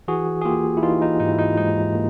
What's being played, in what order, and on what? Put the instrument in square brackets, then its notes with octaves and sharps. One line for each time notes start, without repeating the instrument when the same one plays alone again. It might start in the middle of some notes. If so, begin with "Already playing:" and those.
[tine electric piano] E3 F#4 G#4
G#4
A#3 F4 G4
E4
E3 D#4 F4
D#4
G#2 D#4
E4
D#4
G#2 D#4
A#3